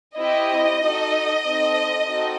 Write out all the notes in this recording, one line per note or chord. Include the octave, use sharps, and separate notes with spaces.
C4 E4 G4 D#5
D#4 F#4 A4
C4 D#4 A4
C4 D#4 F#4 A4